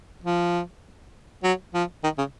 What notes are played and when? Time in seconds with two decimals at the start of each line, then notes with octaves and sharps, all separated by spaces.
0.24 F3
1.44 F#3
1.75 F3
2.04 D#3
2.18 C#3